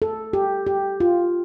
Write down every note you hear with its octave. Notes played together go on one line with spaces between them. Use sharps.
A4
G4
G4
F4